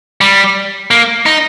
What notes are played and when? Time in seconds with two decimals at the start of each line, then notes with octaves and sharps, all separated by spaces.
0.21 G3
0.91 A#3
1.26 D#4